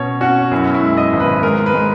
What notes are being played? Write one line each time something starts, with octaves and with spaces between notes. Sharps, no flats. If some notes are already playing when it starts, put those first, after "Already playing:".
Already playing: B2 C#4 C#5
C#4 F#4
F#2 E4
E4
G#3
D#5
G#1
B4
G#3 A#4
B4
G#3